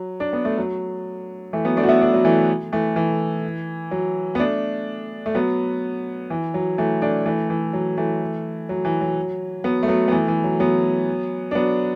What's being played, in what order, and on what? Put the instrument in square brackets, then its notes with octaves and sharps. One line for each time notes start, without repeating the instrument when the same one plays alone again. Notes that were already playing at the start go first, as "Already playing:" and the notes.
Already playing: [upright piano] F#3
D4
B3
A3
F#3
E3 A3
F#3 B3
A3 D4
F#4
B3 E4
A3 D4
F#3
E3 A3
E3 A3
E3
F#3
B3
A3 D4
A3
F#3 B3
E3
F#3
E3 A3
A3 D4
E3 A3
E3
F#3
E3 A3
F#3
E3
F#3
F#3 B3
A3
F#3 B3
B3
E3 A3
E3
F#3
F#3 B3
D4
F#3 B3